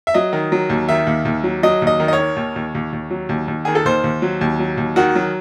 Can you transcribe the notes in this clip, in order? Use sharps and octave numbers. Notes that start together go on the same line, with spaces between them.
E5
F#3 D#5
D#3
F#3
D#2
D#3 E5
D#2
D#2
F#3
F#3 D#5
D#2
D#5
D#3
D#5
C#5
D#3
D#2
D#2
D#2
D#2
F#3
D#2
D#2
D#3 G#4
A4
D#2 C5
D#2
F#3
D#2
F#3
D#2
D#3 F#4
F#3